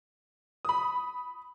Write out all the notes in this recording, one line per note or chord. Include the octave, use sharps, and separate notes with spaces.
B5 D#6